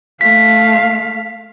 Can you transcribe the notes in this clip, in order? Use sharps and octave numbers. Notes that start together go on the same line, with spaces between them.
A3 F5 B6